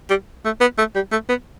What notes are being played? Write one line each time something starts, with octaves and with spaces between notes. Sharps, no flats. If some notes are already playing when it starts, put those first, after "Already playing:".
G3
A3
B3
A3
G3
A3
B3